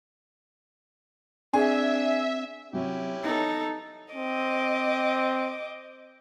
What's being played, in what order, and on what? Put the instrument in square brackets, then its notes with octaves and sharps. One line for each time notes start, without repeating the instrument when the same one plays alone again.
[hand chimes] C4 [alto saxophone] D4 [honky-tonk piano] G#4 [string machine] E5
[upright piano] C3 F#3 F#4 [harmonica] C#4 E4 G4
[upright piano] B3 [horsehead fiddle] D#4 A4
[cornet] C4 [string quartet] D#5 D6